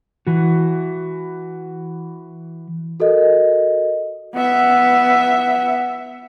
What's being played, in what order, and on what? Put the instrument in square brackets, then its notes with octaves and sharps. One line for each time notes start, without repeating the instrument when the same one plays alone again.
[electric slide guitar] E3 F#4
[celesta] F#4 A4 A#4 D#5
[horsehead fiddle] B3 E5